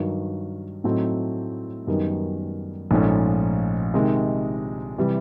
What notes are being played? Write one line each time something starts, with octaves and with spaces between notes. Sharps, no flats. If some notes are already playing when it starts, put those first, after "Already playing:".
Already playing: G2 D#3 F#3
A2 F#3 A3 C4 D#4
F#2 D#3 G3 B3
A#1 G#2 F3 A3 C#4
C3 D#3 G#3
C3 E3 G3